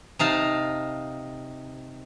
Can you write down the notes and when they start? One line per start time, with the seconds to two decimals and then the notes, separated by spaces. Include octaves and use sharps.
0.19 C3 D#4 F5 A5